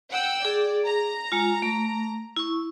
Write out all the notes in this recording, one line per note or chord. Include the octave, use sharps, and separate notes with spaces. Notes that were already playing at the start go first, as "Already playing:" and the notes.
F#5 G5 E6
G#4 D5
A#5
G#3 F4
A3
E4 C#6